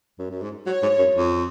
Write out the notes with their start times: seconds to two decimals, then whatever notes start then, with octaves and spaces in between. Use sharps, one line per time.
0.18 F#2
0.30 F#2
0.42 G#2
0.66 F#3 C#5
0.82 G#2
0.98 F#2
1.15 F2